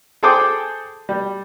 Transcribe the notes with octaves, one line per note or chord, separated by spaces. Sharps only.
G#4 A4 C5 G5 D6 D#6
G3